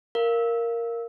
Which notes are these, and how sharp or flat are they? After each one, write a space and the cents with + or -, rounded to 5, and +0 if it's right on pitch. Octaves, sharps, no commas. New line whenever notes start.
A#4 +0 F5 -15